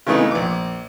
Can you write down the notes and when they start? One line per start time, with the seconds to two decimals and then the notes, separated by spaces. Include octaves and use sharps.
0.07 C#3 E3 G#3 A3 B3 D#4
0.31 A#1 D6